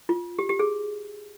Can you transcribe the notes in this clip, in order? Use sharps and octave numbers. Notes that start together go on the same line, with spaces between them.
F4
G4
G4
G#4